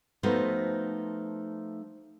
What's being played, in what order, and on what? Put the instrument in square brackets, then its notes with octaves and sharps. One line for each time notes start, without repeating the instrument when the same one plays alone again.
[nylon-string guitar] F3 A3 B3 D#4 F#4 C5